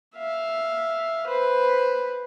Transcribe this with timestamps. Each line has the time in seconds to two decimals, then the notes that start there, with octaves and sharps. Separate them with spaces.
0.16 E5 F5
1.26 B4 C5